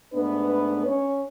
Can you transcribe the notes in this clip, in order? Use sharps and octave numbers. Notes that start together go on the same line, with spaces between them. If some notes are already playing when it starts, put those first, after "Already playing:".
G#2 A3 B3 D4 B4
C#4 C#5